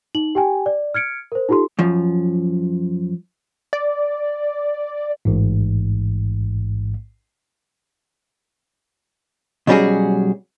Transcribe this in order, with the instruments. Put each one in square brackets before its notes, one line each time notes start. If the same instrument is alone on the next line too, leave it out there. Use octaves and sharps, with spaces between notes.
[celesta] D#4 F#7
G4 G5 G#5
D5
F6 G#6 C#7 D7
A#4 C5
D#4 F4 G4 A4 C6
[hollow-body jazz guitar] F#2 F3
[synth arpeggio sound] D5
[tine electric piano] A1 G#2
[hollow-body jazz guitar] B2 F#3 G3 C#4 F#4 G#4